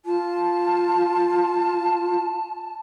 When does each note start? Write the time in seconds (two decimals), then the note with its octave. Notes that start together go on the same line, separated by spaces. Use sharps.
0.05 F4 A5